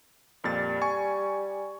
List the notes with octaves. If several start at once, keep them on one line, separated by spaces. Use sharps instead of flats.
F2 A#2 G3 A6
G#5 C#6